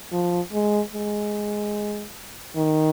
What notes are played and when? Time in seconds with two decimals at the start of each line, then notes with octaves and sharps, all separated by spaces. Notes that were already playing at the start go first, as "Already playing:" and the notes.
0.12 F3
0.53 G#3
0.93 G#3
2.56 D#3